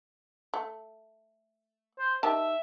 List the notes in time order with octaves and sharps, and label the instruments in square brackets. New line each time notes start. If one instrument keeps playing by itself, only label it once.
[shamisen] A3
[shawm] C5
[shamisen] D#3 G4 A5 [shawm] E5